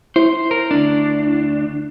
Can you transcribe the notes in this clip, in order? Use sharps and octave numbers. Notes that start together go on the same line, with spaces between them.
E4 C5
A#4
D2 D4